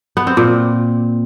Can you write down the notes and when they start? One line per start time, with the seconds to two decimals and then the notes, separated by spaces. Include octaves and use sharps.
0.17 B3
0.27 C4
0.37 A#2